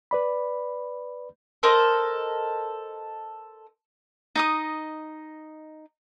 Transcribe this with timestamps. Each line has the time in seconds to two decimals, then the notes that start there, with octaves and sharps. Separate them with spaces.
0.11 B4 D5 B5
1.63 A4 A#4 C5 D#5
4.35 D#4 D#5 D#6